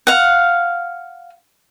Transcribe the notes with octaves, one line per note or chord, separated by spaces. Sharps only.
F5 F#5